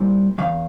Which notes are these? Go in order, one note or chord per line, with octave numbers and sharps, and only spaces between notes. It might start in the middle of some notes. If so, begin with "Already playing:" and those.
Already playing: A#2 G3 C4 E4
E2 C3 E3 F5